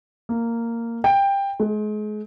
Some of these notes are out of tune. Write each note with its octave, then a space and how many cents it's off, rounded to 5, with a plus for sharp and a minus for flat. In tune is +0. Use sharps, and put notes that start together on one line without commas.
A#3 -10
G5 +15
G#3 +35